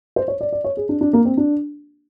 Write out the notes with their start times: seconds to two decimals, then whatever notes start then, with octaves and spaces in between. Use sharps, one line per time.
0.16 C5
0.28 C#5
0.41 D5
0.53 D5
0.64 C#5
0.77 G#4
0.89 D4
1.01 D4
1.13 A#3
1.25 C4
1.37 D4